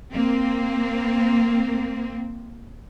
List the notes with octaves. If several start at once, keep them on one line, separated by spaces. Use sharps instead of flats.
A#3 C4